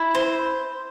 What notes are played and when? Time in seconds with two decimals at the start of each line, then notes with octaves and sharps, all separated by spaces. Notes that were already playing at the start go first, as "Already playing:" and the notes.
Already playing: E4
0.15 C5